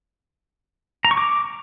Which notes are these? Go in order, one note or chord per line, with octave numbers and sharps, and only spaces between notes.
A#5
C#6
D6